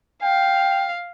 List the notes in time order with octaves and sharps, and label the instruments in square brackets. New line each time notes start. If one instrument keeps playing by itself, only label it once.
[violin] F5 [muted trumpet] G5